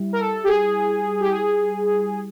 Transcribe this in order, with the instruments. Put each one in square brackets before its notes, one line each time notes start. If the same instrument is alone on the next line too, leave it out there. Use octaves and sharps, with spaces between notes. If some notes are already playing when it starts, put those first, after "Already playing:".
Already playing: [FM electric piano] G3 E4 G4
[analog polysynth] A#4
A4
G4
G#4
G4
G#4